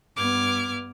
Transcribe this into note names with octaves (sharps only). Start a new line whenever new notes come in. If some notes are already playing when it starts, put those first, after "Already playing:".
G2 B3 D6 F6 G#6